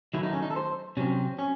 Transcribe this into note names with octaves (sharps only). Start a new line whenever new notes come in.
D#3 F#3 A3 E4
D#4
C#4
D#4
A4
C5
C3 F#3 C4 C#4
C#4